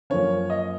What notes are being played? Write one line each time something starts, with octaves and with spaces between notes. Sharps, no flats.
F#2 F3 A#3 C#4 C#5
D#5